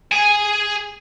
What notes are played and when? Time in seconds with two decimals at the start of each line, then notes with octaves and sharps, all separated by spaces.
0.12 G#4 G#5